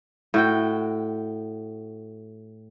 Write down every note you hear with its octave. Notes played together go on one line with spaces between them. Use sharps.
A2 F#4 G5